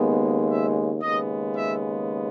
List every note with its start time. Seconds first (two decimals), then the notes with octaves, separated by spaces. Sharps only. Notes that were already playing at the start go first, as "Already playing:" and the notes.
Already playing: D#2 C#3 G#3 B3
0.48 E5
1.02 D#2 C#3 G#3 B3 D#5
1.56 E5